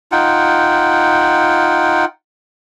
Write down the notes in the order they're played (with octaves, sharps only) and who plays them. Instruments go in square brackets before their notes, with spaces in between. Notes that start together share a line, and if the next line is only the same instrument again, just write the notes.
[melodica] D#4 F4 F#5 G5